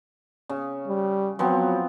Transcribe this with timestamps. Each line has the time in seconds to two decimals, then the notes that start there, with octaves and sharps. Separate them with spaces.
0.49 C#3
0.88 G3
1.39 F3 F#3 B3 C4